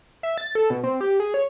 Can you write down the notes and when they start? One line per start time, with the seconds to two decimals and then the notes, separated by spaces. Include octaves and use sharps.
0.23 E5
0.38 A6
0.55 A4
0.70 B2
0.84 C4
1.01 G4
1.20 G#4
1.34 C#5